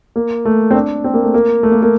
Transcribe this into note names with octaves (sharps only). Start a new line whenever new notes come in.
A#3
A3
C4
D4
C4
A#3
A3
A#3
A3
A#3
A#3